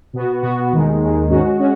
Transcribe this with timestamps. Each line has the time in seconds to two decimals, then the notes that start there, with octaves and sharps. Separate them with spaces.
0.13 B2 B3 F#4
0.43 B2 B3 F#4
0.72 D#2 D#3 G#3
1.01 D#2 D#3 G#3
1.30 G#2 D#3 G#3 C#4 F#4
1.59 G#3 C#4 F#4